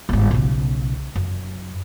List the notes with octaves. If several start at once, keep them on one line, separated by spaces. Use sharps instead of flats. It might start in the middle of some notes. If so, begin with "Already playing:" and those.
G1 G#2
B1 C#3
F#2